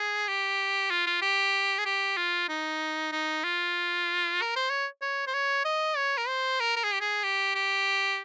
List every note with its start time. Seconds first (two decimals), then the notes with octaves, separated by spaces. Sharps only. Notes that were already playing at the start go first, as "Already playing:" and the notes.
Already playing: G#4
0.28 G4
0.91 F4
1.07 F4
1.22 G4
1.78 G#4
1.86 G4
2.17 F4
2.49 D#4
3.12 D#4
3.44 F4
4.42 A#4
4.56 C5
4.70 C#5
5.02 C#5
5.27 C5
5.34 C#5
5.65 D#5
5.96 C#5
6.18 A#4
6.28 C5
6.60 A#4
6.76 A#4
6.84 G#4
6.93 G4
7.01 G#4
7.23 G4
7.55 G4